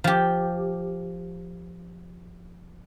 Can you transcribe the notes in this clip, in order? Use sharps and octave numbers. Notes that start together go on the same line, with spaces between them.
F3 G4